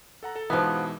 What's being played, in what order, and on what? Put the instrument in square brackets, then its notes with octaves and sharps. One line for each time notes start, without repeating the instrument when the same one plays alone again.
[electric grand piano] A4 F#5 A#5
A4
[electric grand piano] G#2 B2 E3 [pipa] F3 B3